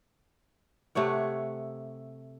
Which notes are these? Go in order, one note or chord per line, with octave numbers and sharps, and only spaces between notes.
C3 A3 C#5 F#5